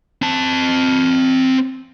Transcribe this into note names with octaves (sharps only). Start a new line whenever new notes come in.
C4 A5